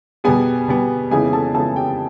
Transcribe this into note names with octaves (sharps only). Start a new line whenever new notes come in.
B2 G3 B3 G#4 G#5
B2 G3 B3
F2 C#3 E3 G#3 B3 G#4 G#5
A4 A5
F2 C#3 E3 G#3 B3 A4 A5
G4 G5